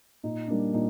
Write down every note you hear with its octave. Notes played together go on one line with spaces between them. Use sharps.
A#2 D#4
G3 A#3 D4
A#2 D#4